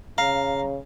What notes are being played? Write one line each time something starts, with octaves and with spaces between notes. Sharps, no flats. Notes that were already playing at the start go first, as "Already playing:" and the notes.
C#3 F5 A#5